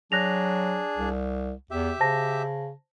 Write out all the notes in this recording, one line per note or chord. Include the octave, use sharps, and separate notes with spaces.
F#3 D4 G#4 F#6 A#6 F7
C2
E2 G4 E5
C#3 C5 A5 A#6